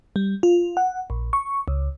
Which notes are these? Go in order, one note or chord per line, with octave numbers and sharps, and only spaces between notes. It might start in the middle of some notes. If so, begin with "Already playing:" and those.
G3
F4
F#5
A#1
C#6
C#2